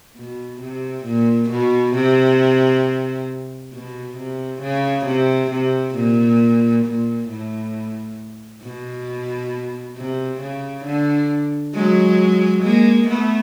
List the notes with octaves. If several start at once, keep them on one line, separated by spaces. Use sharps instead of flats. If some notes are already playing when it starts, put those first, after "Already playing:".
B2
C3
A#2
B2
C3
B2
C3
C#3
C3
C3
A#2
A#2
A2
B2
C3
C#3
D3
F#3 G#3
G#3 A#3
A3 B3